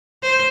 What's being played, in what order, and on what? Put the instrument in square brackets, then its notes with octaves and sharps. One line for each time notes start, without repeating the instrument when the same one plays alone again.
[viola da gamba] C5